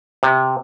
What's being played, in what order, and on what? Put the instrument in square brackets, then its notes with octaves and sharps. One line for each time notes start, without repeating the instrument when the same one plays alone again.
[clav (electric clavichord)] C3